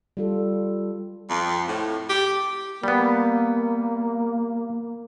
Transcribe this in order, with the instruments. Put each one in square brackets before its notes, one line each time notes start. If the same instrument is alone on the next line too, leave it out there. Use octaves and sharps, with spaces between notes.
[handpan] G3 F4 A4
[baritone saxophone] F2
A2
G4
[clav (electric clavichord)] G3 B3 [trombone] A#3